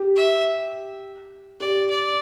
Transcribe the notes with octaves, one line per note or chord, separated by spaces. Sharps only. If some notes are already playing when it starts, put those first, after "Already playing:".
Already playing: G4
E5
G4 D5
D5